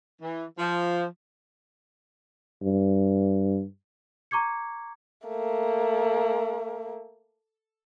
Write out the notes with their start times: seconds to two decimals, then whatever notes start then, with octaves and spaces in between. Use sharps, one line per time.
0.21 E3
0.58 F3
2.62 G2
4.31 A#5 C#6 D6 G#6 C#7
5.28 A3 A#3